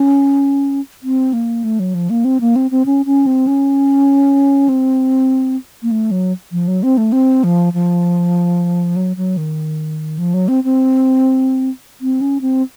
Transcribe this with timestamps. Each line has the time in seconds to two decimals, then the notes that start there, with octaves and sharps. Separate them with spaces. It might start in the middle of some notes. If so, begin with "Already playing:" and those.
Already playing: C#4
1.03 C4
1.33 A#3
1.64 A3
1.79 F#3
1.94 F3
2.10 A#3
2.25 C4
2.41 A#3
2.56 C4
2.71 C4
2.86 C#4
3.06 C#4
3.26 C4
3.47 C#4
4.69 C4
5.83 A#3
5.91 A3
6.11 F#3
6.52 F3
6.68 F#3
6.83 C4
6.97 A3
7.12 C4
7.44 F3
7.73 F3
8.96 F#3
9.17 F#3
9.37 D#3
10.18 F3
10.34 F#3
10.48 C4
10.64 C4
12.01 C4
12.21 C#4
12.41 C4